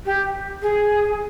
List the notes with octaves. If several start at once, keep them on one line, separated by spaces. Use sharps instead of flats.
G4
G#4